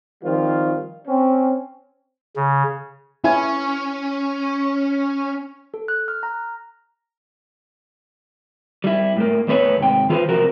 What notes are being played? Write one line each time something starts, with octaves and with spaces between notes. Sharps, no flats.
D#3 F3 G3 C4 F4
C4 C#4
C#3
C#4 E4 G#5
A4
F#6
F6
A#5
G3 E4
A2 A#3
E2 A2 B3 B4 C#5
G#2 C3 G5
E3 F4 G#4 A4 B4 C5
C3 F3 F#4 A#4